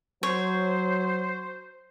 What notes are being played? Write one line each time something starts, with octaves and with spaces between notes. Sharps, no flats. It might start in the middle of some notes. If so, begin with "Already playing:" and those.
F#3 C5 C#5